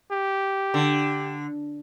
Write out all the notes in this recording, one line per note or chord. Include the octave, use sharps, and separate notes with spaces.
G4
D3